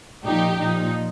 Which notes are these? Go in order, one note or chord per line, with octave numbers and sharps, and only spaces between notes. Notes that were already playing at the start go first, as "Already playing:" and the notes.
A#2 F3 D#4 G4
A#2 F3 D#4